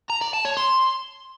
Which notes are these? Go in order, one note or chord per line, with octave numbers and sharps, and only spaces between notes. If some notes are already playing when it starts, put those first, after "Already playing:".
A#5
D5
A5
C#5
C6